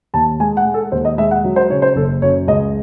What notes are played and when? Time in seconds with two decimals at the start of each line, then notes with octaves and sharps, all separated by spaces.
0.14 D#2 A5
0.40 G#3 G#5
0.57 F#5
0.65 G#3
0.74 A4
0.92 D#2 C5
1.05 D#5
1.18 G#3 E5
1.31 F#5
1.44 F#3
1.56 C5
1.70 C#3 C#5
1.82 C5
1.96 F#1 A4
2.22 F#2 C#5
2.48 C#2 D#5